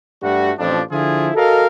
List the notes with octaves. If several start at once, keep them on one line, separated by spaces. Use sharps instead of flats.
G2 G3 A3 F#4
A1 F2 F3 D4
D3 F3 E4 F4 G#4
F#4 A4 A#4 D#5 F5